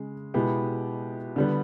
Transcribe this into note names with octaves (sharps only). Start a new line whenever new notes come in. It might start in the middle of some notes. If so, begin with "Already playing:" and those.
Already playing: C#3 G#3
B2 G#3 B3 E4 G4
D3 G3 B3